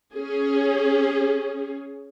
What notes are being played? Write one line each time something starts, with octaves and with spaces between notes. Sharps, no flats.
C#4 G#4